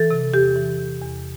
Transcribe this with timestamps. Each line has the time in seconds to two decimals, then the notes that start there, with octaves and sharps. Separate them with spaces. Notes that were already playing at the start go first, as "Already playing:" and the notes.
Already playing: E3 A4
0.10 C3
0.34 E2 G4
0.56 E3
0.79 E3
1.01 E2